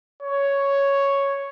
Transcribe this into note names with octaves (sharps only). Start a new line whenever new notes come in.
C#5